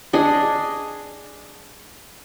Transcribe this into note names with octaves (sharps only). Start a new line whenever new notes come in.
D4 G#4 D#5